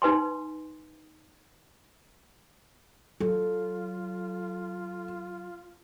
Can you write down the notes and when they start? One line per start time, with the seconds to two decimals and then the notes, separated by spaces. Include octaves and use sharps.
0.02 D#4 B4 G#5 C6
3.20 F#3 F4 A4